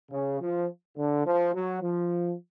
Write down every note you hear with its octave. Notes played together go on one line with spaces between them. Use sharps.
C#3
F3
D3
F3
F#3
F3